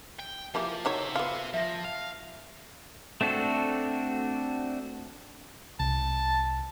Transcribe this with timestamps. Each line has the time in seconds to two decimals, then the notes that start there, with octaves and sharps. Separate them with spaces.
0.20 G5
0.55 E3 F3 A#3 G4
0.85 F#3 D#4 C5 C#5 E5
1.16 B3 F4
1.54 F3 E5 A#6
1.85 F5 F7
3.21 A3 C4 D4 F#4 A4
5.80 C2 A5